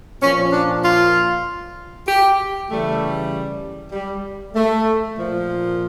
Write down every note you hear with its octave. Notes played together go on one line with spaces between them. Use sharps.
A#2 F3 C#4
D4
F4
G4
C#3 E3 G3 A3
G3
A3
A#2 F3